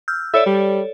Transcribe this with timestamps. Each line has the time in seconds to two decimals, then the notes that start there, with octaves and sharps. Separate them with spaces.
0.08 E6 F6 G6
0.34 A4 C#5 D5 E5
0.46 G3